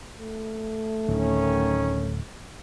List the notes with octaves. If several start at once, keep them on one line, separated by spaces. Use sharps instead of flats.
A3
D1 D#3 C#4